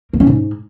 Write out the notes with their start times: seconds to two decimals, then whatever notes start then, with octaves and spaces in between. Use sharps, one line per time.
0.13 A#3
0.20 C#4
0.27 G#2